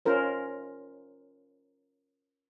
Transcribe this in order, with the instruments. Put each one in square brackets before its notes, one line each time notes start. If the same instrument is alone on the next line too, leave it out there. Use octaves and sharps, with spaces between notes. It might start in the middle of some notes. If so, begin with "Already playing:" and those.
[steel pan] C#4 F4 A#4 C5